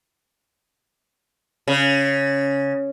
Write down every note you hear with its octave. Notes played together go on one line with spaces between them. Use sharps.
C#3